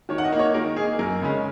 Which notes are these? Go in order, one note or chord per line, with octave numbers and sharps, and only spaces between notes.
D#3 C#5
F#5
D#5
A#3 D#4
C#5
D#3 A#4
A#3 D#4 G#4
F#2 A#4
C#3 G#3 C#4